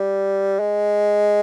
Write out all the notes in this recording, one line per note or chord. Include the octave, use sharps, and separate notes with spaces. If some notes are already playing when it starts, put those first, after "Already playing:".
Already playing: G3
G#3